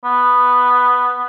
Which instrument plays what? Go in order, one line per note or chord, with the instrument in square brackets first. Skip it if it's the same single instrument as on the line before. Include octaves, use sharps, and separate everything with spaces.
[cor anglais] B3